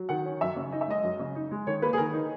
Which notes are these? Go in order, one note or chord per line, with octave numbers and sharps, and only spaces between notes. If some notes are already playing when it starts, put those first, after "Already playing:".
Already playing: F#3
D#3 F#5
C#4
F#2 E5
C#3
D#4 D#5
E5
G#3 D#5
F#2
C#3
D#4
G#3
D#3 C#5
A#3 B4
G#4
D#3 A#4
D#4